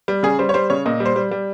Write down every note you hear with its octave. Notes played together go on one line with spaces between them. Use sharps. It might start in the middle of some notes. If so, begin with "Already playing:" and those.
G3
C#3 G#4
G3 C5
C#5
G3 C5
C#3 C#5
A#2 D#5
G3
C5
G3
G3